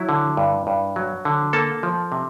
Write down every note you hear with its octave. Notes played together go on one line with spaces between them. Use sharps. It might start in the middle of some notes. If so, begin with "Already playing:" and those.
Already playing: F#3 E4
D3
G2
G2
F#3
D3
A#3 A4 A5
F3
C3